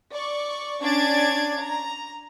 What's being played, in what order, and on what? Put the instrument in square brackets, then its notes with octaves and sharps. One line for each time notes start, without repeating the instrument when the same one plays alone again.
[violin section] D5 C#6
C#4 D4 D5 G#6 A6 D7
A#5